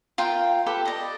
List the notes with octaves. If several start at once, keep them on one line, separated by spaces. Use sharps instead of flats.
F4 A#4 G5
G4 A4 B4
D5 D#5